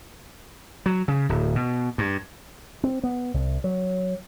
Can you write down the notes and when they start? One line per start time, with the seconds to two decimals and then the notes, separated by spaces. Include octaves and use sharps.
0.86 F#3
1.08 C#3
1.29 D1
1.56 B2
1.98 G2
2.84 C4
3.03 B3
3.34 C2
3.64 F#3